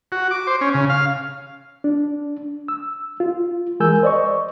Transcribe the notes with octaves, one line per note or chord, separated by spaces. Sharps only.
F#4
D6
C5
C#4
C#3
F5
D4
E6
F4
E3 G#3 A#4 G#5 E6 G6
C5 D5 D#5 C#6